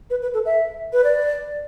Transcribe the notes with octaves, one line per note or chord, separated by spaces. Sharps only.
B4
B4
A4
E5
B4
D5